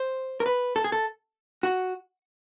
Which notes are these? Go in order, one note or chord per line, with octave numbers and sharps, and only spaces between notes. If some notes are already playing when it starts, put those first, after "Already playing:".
Already playing: C5
A#4
B4
A4
G#4
A4
F#4